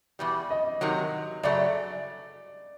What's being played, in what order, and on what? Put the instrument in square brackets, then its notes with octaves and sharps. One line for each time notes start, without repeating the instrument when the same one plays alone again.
[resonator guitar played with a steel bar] E2 B2 G3
[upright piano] D#5
[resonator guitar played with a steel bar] C3 D#3 F#3
[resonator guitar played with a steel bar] F#2 C#3 F#3 A3 [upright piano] D5